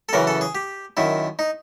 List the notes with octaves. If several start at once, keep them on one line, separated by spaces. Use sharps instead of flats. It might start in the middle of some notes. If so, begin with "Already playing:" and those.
A4
F#2 C#3 E3 A#4
A4
G#4
G4
F#2 D#3 E4
D#4